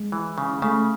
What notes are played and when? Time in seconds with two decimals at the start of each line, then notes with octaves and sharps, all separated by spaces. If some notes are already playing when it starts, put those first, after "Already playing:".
Already playing: G#3
0.12 E3
0.38 C#3
0.62 C#3 A3